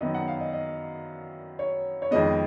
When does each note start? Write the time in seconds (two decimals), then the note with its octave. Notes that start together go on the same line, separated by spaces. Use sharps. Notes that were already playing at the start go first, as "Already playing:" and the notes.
0.01 F#2 D#3 F#3 B3 D#5
0.14 F#5
0.28 F5
0.40 D#5
0.53 D#5
1.59 C#5
2.02 C#5
2.11 F2 D#3 G#3 B3 D#5